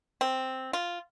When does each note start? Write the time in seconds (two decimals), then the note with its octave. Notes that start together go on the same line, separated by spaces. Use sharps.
0.21 C4
0.73 F4